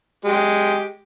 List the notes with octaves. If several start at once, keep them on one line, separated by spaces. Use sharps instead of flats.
G#3 G4